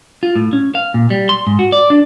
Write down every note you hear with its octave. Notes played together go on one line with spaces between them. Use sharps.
F4
A2
C#4
F5
A#2
G3
C6
G#2
F#4
D5
D4